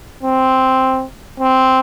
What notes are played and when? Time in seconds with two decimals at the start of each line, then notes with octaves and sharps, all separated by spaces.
0.23 C4
1.40 C4